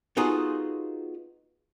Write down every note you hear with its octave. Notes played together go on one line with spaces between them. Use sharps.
B3 D#4 F4 F#4 G#4 A4